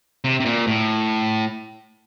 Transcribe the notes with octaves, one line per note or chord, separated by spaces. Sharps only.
C3
C3
A#2
A2